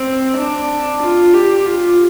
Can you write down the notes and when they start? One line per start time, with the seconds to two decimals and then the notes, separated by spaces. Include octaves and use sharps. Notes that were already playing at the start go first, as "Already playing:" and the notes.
Already playing: C4
0.36 D4
1.02 F4
1.34 G4
1.66 F4